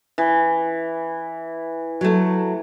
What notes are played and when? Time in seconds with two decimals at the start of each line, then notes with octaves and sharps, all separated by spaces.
0.18 E3
2.01 F#3 A3